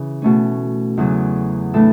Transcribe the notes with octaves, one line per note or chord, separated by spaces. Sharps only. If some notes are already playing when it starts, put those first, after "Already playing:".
Already playing: C#3 E3
B2 A3 C#4
E2 C#3 F#3
A2 E3 A3 D4 A4